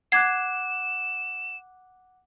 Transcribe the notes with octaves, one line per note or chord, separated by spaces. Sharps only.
F#5 D6 F#6 G#6 C7 E7